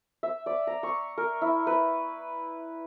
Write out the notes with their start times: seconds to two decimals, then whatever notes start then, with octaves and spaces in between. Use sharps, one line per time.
0.23 E5
0.46 D5
0.67 A#5
0.83 C#6
1.18 A#4
1.42 E4
1.67 B4